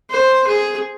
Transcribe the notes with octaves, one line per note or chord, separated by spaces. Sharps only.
C5
G#4